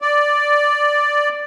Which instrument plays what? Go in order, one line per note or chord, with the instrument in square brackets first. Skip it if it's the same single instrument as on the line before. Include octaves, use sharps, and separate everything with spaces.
[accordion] D5